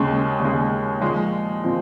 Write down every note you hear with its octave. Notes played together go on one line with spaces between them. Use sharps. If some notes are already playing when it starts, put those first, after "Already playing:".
Already playing: D#2 C#3 G#3 C#4
D#2 C#3 G#3
A#2 F3 G#3
A#2 F3 C4